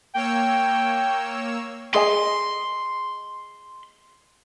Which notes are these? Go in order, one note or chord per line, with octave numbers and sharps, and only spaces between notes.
A#3 C#5 G5 E6
G#4 D#5 G#5 C6